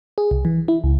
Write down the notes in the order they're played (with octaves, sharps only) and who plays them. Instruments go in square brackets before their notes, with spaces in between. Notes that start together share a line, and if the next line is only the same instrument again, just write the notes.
[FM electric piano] G#4
C2
E3
E4
C#2